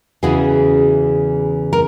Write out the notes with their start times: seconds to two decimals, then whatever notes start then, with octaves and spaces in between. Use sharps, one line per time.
0.23 E2 C#3 E3 F#4 G#4
1.73 A#4